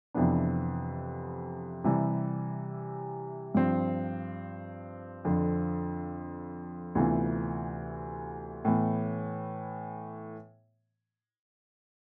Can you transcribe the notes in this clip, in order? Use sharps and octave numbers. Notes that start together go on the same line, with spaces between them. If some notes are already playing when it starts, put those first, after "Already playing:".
F2 C3 E3 B3 D4
C3 E3 G3
G2 F3 C4
F2 D3 F3
D2 C3 E3 B3 F4
A2 E3 B3